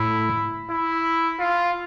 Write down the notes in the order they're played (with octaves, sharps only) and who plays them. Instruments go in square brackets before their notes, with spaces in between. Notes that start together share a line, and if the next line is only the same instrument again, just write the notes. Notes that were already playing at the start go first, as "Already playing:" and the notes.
Already playing: [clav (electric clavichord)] A2 [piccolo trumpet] E4
[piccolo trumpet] E4
F4